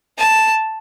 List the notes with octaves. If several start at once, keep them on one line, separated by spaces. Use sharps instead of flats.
A5